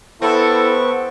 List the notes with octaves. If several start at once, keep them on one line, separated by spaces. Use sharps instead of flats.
B3 C4 E4 A4 C#6